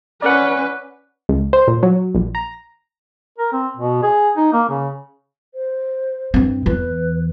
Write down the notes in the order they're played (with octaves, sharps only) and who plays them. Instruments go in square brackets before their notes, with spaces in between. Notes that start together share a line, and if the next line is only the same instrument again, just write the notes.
[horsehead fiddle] C#4 B4 [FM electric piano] D5 F#5
[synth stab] C#2
C5
A#2
F#3
A#1
A#5
[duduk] A#4
C4
B2
G#4
D#4
A#3
C#3
[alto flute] C5
[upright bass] G2 C4
[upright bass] E2 E3 [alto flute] B4